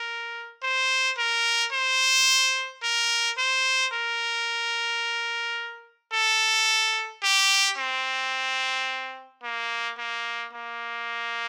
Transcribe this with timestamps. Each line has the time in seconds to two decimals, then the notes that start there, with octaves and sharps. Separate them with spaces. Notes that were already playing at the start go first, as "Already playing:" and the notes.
Already playing: A#4
0.63 C5
1.18 A#4
1.73 C5
2.83 A#4
3.38 C5
3.93 A#4
6.13 A4
7.23 G4
7.78 C4
9.43 A#3
9.98 A#3
10.53 A#3